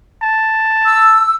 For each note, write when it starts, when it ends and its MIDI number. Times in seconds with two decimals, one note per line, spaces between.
0.23 1.27 81
0.85 1.34 88